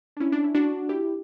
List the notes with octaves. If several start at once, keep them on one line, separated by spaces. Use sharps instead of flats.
D4
C#4 E4
D4
E4
D4 F#4
E4 G4